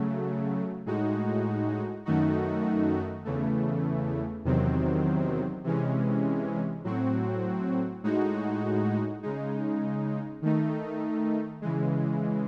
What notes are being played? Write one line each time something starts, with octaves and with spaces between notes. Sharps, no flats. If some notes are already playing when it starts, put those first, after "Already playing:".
Already playing: C#3 F#3 A3
A2 G#3 D#4 F#4
F#2 D#3 A3 D#4 F#4
E2 C#3 E3 A3
E2 C3 D#3 F#3 C4
C3 E3 G#3 C#4
A2 F#3 C4 F#4
A2 G#3 D#4 F#4
C#3 G#3 D#4
D#3 A3 D#4
C#3 E3 G#3